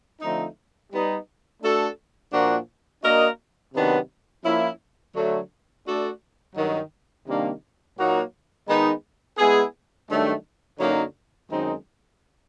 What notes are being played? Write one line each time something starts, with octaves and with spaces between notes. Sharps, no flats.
D3 F3 A3 C4 D#4
G3 B3 D#4
A3 D4 F#4 A4
A#2 F3 A#3 D4 F#4
A#3 D4 F#4 A#4 D#5
C3 D#3 F#3 B3 D4
F3 A#3 C#4 E4
D3 F#3 A3
A3 D4 F#4 A4 D5
G2 D#3 F#3
C3 D#3 G3 A#3 D4
A#2 F#3 A#3 D#4 F#4
D#3 G#3 B3 D#4
G#3 B3 E4 G#4
G2 D#3 F#3 A3 D4
F#2 D3 F#3 A#3 D#4
F#2 D#3 G#3 C4 D#4